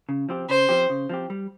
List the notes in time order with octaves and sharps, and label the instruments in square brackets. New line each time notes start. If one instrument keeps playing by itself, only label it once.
[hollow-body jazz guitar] C#3
F3 C4 G4
[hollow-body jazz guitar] C#3 [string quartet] C5
[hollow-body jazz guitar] F3 C4 G4
C#3
F3 C4 G4
G3